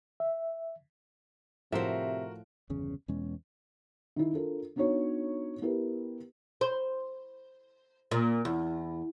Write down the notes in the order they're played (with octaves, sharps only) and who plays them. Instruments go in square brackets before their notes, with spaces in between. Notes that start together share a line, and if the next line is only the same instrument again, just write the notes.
[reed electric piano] E5
[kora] A2 F3 [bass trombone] C3 [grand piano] F#4 A#4 [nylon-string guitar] C5 E5
[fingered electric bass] G1 E2 C#3 C#4
E2 B2 G#3 C#4
[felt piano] D#3 E4
D4 F4 A4 A#4
B3 D4 D#4 F#4 C#5
B3 E4 G4 A#4 B4
[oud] C5
A#2
E2